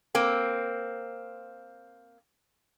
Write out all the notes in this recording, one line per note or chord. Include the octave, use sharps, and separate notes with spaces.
A#3 C4